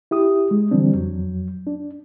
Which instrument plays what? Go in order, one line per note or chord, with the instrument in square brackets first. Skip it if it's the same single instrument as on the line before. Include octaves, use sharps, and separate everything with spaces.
[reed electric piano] E4 G4 D#6
G#3
D3 E3 G3 C4 D4
F2 F#3
D4